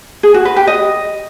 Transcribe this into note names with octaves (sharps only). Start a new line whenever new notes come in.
G#4
F#4
B4
G4
D#5